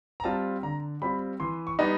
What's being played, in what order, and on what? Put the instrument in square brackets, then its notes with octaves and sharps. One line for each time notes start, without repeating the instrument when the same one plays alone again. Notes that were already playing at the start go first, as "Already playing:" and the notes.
[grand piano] A#5
G3 C4 F4 A5
D3 A#5
G3 C4 F4 B5
E3 C6
C#6
G3 B3 D#4